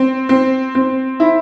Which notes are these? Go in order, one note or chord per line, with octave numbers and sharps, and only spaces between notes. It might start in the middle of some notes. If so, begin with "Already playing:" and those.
Already playing: C4
C4
C4
E4